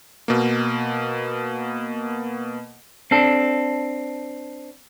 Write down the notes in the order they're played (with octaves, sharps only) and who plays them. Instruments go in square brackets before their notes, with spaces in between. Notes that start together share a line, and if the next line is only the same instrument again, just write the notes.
[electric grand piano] B2 A#3
[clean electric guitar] C4 D4 A4